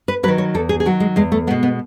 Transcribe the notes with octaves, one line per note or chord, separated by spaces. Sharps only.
B4
D#3 F#3 B4
C#5
E2 A4
G#4
G#4
D#3 F#3 F#4
G#3
E2 G#3
A3
B2 G#3 B3
B3